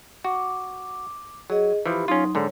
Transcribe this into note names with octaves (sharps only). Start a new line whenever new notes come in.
F#4 D6
F#3 G#4 D#5
E3 F3 G4 B5
F#3 C#4 D#4 F4 C6
G#2 D3 C#5